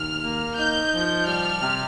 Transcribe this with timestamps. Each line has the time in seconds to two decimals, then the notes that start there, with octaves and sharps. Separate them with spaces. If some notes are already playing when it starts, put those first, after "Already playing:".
Already playing: D#2 F6
0.22 A#3
0.57 D#4 G6
0.92 F3
1.26 G3 F6
1.61 C3